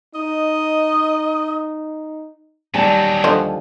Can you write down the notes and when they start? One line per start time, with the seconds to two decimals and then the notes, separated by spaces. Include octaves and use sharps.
0.15 D#4 D#5
2.74 D#2 A#2 F#3 G3 G#5 A5
3.24 D3 F3 D#5